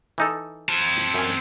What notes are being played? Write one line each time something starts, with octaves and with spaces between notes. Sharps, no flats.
E3 D#4 A4
C4 A5
F#2 C#4